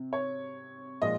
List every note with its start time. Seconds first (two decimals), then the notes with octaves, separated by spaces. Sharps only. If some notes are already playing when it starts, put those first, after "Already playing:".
Already playing: C3
0.13 C#5
1.02 A#2 F3 G#3 D#5